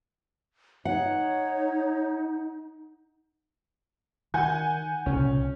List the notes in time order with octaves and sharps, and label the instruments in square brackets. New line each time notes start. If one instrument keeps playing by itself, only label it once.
[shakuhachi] D#4 [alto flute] C#5 [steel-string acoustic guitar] F#5
[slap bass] D#3 [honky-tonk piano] F#5 G#5 G6
[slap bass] C2 A#2 C#3 [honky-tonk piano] C#4